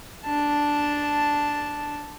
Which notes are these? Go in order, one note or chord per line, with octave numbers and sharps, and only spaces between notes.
D4 A5